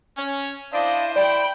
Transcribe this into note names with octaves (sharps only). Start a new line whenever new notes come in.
C#4
D4 E4 C5 D5 D#5 F5
D5 G5 B5